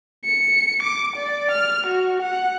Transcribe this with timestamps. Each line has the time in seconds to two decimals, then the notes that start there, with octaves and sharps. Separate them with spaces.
0.25 C#7
0.83 D6
1.17 D5
1.52 F6
1.87 F#4
2.22 F#5